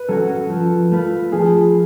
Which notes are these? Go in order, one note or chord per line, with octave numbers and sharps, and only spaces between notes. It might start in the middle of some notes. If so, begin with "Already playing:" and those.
Already playing: B4
F#3 C#4 F#4 A4
F3
A3 F4 B4
F3 G#4